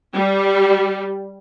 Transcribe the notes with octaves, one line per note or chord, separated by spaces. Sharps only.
G3